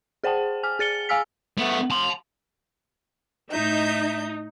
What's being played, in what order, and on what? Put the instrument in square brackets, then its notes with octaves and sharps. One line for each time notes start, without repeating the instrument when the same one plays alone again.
[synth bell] G#4 C5 F#5 G5 A5
G#5 F6
G#4 A6 C#7 G7
F5 G#5 E6 F6 B6
[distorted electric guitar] A3 B3
A5 C6
[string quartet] A2 E5 G6 [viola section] D#4